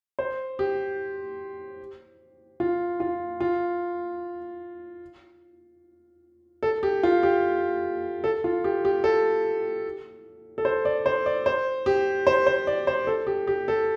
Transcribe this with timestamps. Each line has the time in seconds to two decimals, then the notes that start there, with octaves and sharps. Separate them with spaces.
0.19 C5
0.59 G4
2.60 F4
3.00 F4
3.40 F4
6.63 A4
6.83 G4
7.03 F4
7.23 G4
8.24 A4
8.44 F4
8.64 G4
8.85 G4
9.04 A4
10.58 A4
10.65 C5
10.85 D5
11.06 C5
11.26 D5
11.46 C5
11.86 G4
12.27 C5
12.47 C5
12.67 D5
12.87 C5
13.07 A4
13.27 G4
13.47 G4
13.68 A4